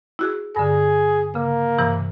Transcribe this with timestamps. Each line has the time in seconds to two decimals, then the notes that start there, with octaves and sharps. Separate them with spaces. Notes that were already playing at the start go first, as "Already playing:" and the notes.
0.19 E4 F#4 G#4
0.56 G2 D3 G#4
1.35 C#3 A#3
1.78 G2 C3 E3